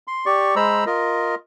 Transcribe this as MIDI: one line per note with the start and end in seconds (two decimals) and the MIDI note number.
0.07 0.25 84
0.26 0.55 67
0.26 0.55 74
0.26 0.55 85
0.56 0.84 56
0.56 0.84 72
0.56 0.84 82
0.56 0.84 83
0.56 0.84 88
0.86 1.35 65
0.86 1.35 70
0.86 1.35 75